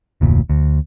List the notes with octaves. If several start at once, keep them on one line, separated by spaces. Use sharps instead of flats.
F1 D2 A#2
D2